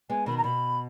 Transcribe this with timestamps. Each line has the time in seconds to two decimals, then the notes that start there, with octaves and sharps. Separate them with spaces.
0.10 G#3 B3 G#5
0.26 B2 D#3 B5
0.37 A#5
0.44 B2 B5